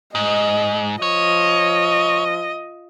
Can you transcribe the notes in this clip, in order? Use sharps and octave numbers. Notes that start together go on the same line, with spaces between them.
G#2 D#5
F3 C#5 D#5